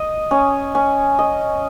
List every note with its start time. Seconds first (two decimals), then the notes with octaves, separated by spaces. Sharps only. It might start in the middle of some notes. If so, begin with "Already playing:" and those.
Already playing: D#5
0.31 C#4
0.75 C#4
1.19 D#5